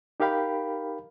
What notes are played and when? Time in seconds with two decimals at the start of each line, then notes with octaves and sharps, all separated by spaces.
0.20 D#4 G4 A#4 F5 G5 B5